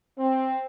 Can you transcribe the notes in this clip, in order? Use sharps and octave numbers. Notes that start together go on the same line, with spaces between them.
C4